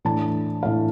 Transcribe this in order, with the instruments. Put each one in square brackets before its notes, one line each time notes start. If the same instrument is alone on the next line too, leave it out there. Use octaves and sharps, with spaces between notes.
[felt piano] A2 E3 A3 D4 A5
A2 E3 A3 D4 F5